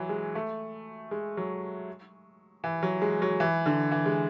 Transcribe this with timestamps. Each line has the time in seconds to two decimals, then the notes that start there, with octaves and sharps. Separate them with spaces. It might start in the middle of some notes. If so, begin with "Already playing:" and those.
Already playing: E3 F#3
0.09 G#3
0.35 A3
1.11 G#3
1.37 F#3
2.64 E3
2.83 F#3
3.02 G#3
3.22 F#3
3.40 E3
3.66 D3
3.92 E3
4.06 G#3